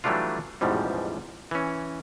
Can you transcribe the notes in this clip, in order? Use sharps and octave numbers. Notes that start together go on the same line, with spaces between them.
E3 F#3 G3 A3 D4 F4
A1 E2 G#2 B2 F3 G3
E3 C#4